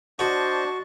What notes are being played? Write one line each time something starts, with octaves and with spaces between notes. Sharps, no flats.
D4 F#4 C5 D5 D#5 A5